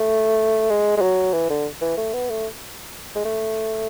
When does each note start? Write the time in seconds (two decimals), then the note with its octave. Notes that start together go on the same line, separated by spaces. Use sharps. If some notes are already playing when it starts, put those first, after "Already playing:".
Already playing: A3
0.70 G#3
0.97 G#3
1.01 F#3
1.33 E3
1.50 D3
1.81 E3
1.97 A3
2.13 B3
2.30 A3
3.15 G#3
3.25 A3